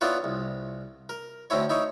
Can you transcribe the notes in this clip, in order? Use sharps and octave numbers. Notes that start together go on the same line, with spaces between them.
B3 D4 E4 F4 B4 C#5
C2
A#4
D2 A2 C4 E4 C#5
D#4 E4 C#5